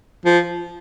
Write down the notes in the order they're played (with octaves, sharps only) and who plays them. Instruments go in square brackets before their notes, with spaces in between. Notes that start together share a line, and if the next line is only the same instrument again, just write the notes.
[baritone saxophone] F3